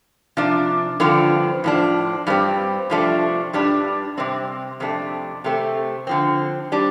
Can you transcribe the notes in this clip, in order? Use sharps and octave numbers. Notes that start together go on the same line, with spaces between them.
C3 F3 D4
G2 D3 F3 C4
A2 F3 D4
G2 G3 C4
C3 F3 A3 D4
G2 G3 D4
C3 G3 C4
F2 C3 A3 D4
C3 A3 C4
D3 F3 C4
G3 D4